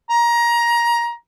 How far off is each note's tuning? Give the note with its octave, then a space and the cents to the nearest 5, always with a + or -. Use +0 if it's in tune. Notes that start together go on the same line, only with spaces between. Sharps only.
A#5 +20